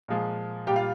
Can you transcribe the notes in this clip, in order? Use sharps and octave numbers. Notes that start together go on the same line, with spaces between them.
A#2 F3 G#3
A#2 G3 G4 G5
F4 F5